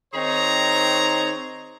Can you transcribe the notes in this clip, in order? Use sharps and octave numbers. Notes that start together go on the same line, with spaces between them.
D#3 C4 D#4 G#4 C#5 A#5